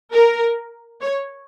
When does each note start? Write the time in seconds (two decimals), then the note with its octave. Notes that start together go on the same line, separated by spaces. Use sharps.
0.14 A#4
1.01 C#5